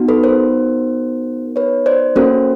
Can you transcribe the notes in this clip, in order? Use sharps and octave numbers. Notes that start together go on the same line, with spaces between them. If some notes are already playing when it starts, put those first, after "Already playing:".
Already playing: B3 D#4 F#4
A4 B4
A#4 C5
B4 C#5
C5 D5
A#3 C#4 F#4 A4 A#4 C5